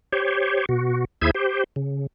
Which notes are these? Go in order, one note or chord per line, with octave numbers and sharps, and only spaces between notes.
G4 C5 C#5
B2 F#4
D#2 E4 G#4 C5 E5 G#6
G4 C5
C#3